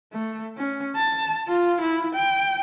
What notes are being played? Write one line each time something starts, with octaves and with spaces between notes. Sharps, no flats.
A3
C#4
A5
F4
E4
G5